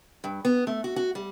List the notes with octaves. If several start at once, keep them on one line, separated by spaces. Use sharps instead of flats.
G2
B3
A3
F#4
F#4
G3